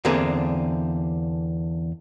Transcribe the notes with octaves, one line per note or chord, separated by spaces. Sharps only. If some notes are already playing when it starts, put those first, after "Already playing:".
E2 D3 A#3 C4 D4 G#4